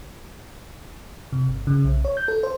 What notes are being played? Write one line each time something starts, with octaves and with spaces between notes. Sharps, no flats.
C3
G1
C#3
B1
C#5
G6
A4
C5